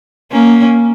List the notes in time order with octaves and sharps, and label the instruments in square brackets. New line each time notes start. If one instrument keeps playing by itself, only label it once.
[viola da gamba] A#3 C#4